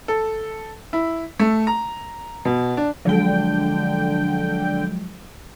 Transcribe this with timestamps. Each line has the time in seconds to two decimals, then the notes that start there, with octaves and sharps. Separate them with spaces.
0.08 A4
0.93 E4
1.40 A3
1.67 A#5
2.45 B2
2.77 D4
3.05 D3 F3 F#3 G#3 G5